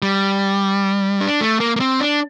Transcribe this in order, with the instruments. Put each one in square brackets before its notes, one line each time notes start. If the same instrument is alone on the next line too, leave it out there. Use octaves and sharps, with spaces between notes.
[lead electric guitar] G3
D4
A3
A#3
A#3
C4
D4